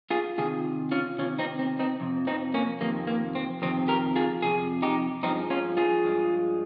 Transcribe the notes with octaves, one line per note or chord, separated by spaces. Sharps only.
F4 G#4
C3 D#3 F4 G#4
C#4 F4
C3 D#3 C#4 F4
C4 D#4
C4
C4 D#4
F2 C3
C4 D#4
A#3 C#4
F2 C3 D#3 A#3
A#3
C4
F2 C3 D#3 C4
G4 A#4
F4 G#4
F2 C3 G#4
D#4 G4
G2 F3 G#3 C4 D#4
C#4 F4
F4 G#4
G2 F3 G#3